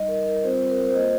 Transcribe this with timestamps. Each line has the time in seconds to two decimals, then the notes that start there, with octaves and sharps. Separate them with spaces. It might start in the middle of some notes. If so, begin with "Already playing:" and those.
Already playing: G3 D#4 D#5
0.08 A#4
0.26 A#4
0.43 G3 C4 F4 C5
0.70 A#4
0.89 C5
0.95 A#3 F4 D#5